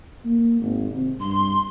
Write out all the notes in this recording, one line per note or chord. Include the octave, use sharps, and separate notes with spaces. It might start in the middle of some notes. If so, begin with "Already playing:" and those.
A#3
G#1
C3
G2 C6